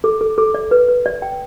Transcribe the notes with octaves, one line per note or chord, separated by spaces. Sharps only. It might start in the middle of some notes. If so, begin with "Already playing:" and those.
A4
A4
A4
D5
B4
B4
D5
G5